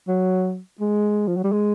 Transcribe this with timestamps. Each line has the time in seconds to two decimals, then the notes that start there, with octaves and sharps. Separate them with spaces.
0.08 F#3
0.80 G#3
1.27 F3
1.36 F#3
1.44 G3
1.52 G#3